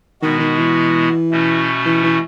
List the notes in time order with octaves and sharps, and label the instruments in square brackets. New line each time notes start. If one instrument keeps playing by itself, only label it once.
[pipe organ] B2 G#3 B3 F#4 [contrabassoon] D#3
[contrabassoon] D#3
E3
[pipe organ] B2 A3 C#4 F#4
[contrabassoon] E3
E3